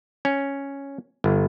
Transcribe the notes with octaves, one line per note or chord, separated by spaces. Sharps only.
C#4
G1